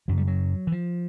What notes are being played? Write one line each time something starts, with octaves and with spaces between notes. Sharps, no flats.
F#2 C#3 F#3
G3
F#3
E3
F3